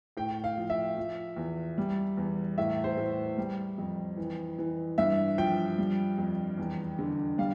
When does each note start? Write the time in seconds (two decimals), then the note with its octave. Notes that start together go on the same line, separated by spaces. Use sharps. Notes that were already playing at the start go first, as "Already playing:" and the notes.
0.17 A2 G5
0.44 F5
0.57 F3
0.70 E5
0.97 F3
1.37 E2
1.78 G3
2.17 E2
2.58 A2 E5
2.84 C5
2.97 A2
3.38 G3
3.78 F2
4.17 E3
4.58 E3
4.98 G2 E5
5.38 F3 G5
5.78 G3
6.18 F2
6.58 E2
6.99 D3
7.38 G3 F5